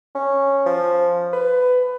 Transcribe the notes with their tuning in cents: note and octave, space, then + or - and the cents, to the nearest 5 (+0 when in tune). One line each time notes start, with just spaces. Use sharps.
C#4 -5
F3 +0
B4 +20